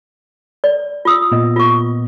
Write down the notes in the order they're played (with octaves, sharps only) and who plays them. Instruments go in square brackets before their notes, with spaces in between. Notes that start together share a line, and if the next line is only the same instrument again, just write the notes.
[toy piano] D5
F4 D#6 E6
[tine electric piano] A#2 B3 D#5
[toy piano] F4 C#6